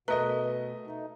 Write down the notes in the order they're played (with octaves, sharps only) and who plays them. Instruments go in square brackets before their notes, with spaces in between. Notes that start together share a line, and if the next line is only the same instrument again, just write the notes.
[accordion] B2 [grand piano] A3 D#5 [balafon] A#4 E5 A#5 [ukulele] B4
[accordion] A3 D#4